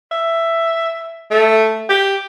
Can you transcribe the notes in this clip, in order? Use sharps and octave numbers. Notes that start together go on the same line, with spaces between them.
E5
A3
G4